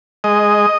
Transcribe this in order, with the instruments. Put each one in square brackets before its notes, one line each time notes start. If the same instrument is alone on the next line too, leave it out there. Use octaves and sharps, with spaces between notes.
[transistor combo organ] G#3 D#5